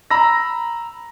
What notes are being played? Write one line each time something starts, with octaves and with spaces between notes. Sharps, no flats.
A#5 B5 E6 A#6